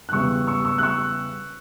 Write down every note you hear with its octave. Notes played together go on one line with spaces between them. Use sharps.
F#6
E2 C#3 G3 C#6 E6
C#6 E6
C#6 E6
F#6
C#6 E6